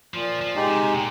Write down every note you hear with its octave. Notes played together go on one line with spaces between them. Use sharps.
A#2 F3
F3
G#3 D#4 G4
C3
A#2